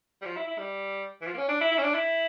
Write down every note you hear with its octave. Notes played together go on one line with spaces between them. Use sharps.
G3
F3
E4
E4
G3
E3
F3
A#3
C#4
D4
E4
E4
C#4
D4
E4